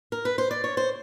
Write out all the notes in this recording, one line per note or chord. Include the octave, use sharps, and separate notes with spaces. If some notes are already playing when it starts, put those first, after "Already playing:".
A#4
B4
C5
D5
C#5
C5